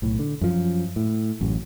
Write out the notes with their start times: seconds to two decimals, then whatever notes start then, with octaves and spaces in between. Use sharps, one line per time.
0.02 B1 A2
0.19 D3
0.41 F#2 F3
0.96 A2
1.41 A1 F#2